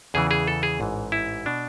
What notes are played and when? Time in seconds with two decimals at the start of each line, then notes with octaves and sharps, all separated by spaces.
0.14 E2 C#3 E3 G#4
0.31 G#4
0.48 A4
0.63 G#4
0.80 A1 G#2 E3
1.12 E4
1.46 B2 D4